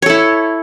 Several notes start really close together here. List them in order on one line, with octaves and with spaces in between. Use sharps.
C#5 A4 E4